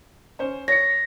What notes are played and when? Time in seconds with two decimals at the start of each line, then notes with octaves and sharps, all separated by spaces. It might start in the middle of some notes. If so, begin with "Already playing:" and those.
0.39 C#4 C5
0.68 C#5 A#6 C#7